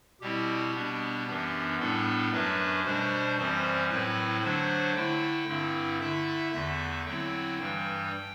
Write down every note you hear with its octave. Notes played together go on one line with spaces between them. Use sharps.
B2 G3 C4 E4 G4
B2 G3 B3 D4
F#2 E3 B3 D4
A2 G3 B3 D4 A4
F#2 F#3 A3 D4 B4
B2 G3 D4 C5
F#2 E3 G3 C4 C5
A2 F#3 C4 E4 B4
D3 F#3 A3 D4 C5
D3 A3 E4 G5
G2 D3 A3 C4 E4
D3 A3 E4 E5
E2 D3 A3 E5
D3 F#3 C4 E4 G5
G2 E3 G3 G5